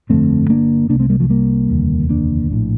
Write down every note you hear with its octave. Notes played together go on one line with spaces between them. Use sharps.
G1 F2 D3 A3 C4
A#3 D4
C2 C3 A#3 D4
A3 C4
G3 A#3
F3 A3
G3 A#3
F1 D#2 D3
A#3 D4
A#1 A2